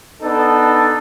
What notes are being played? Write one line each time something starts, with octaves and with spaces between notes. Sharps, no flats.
B3 D4 D#4 A4